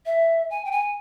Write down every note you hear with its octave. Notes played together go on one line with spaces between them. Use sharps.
E5
G#5
G5
G#5